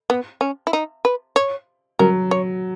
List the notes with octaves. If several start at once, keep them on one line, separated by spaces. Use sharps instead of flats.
B3
C#4
E4
D#4
B4
C#5
F#3 A#4
C#5